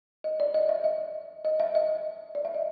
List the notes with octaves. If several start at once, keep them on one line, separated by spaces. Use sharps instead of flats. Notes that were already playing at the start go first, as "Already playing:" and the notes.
D#5
D5
D#5
E5
D#5
D#5
E5
D#5
D5
E5
D#5